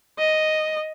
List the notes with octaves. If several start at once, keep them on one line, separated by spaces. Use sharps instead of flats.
D#5